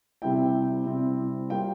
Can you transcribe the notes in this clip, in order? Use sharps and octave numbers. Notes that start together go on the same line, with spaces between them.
C3 G3 C4 E4 G5
C3 G3 C4 E4
G3 A#3 F4 G5